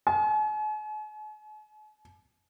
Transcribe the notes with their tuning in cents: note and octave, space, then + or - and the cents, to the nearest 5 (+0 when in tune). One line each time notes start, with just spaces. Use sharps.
G#5 +45